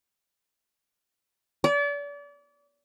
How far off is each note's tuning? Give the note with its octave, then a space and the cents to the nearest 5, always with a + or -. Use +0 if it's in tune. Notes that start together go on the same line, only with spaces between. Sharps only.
D5 -35